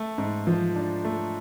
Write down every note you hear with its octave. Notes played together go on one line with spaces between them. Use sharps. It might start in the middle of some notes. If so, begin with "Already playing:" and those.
Already playing: A3
G#2
F3
D4
A3